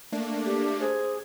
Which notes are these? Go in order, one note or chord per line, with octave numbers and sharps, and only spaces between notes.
A3 A#3 D4
G4
G#4 C5